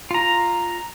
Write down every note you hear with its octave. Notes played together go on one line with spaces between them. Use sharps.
F4 A#5